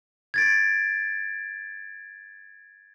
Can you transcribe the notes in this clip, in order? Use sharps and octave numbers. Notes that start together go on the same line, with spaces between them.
G#6 A6 D7